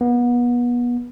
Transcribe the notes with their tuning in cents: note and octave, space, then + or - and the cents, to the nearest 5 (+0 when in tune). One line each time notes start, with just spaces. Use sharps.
B3 -30